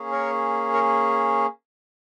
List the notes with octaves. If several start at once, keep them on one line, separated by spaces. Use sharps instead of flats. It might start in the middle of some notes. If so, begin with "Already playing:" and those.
Already playing: A#3 C#4 G#4
A#4 C#5
A#4 C#5